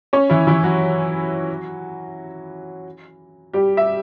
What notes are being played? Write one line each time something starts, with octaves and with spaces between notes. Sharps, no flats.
C#4 C#5
E3 E4
E3 E4
F#3 F#4
G3 G4
E5